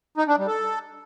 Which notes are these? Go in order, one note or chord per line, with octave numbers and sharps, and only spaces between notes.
D#4
D4
G3
A4